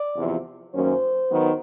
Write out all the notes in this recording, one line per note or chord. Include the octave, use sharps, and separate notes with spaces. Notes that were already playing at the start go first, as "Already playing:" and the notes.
Already playing: D5
E2 C3 F3
F#2 D#3 F#3 A#3 C#4 C5
D#3 F#3 B3